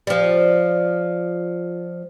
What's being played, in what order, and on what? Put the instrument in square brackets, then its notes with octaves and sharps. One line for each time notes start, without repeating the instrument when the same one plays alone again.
[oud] F3 G3